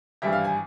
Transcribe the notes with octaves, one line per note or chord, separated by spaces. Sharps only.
G#1 G2 E3 G3 E5
F5
G#5